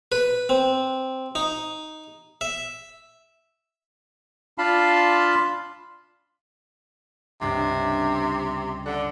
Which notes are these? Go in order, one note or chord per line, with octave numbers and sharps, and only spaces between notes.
B4
C4
D#4
E5
D4 F4 F5 A5 B5 C6
C#2 G2 C3 D4
D3 A4 F#5